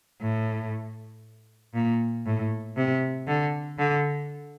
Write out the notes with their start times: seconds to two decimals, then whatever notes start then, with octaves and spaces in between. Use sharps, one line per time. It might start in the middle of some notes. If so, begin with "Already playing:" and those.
0.21 A2
1.74 A#2
2.26 A2
2.77 C3
3.27 D3
3.78 D3